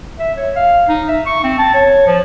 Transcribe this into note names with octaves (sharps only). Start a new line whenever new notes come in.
E5
C#5
F5
D#4
E5
C#6
C4
A5
C#5
F3